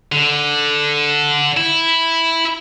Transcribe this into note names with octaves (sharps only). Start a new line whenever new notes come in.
D3
E4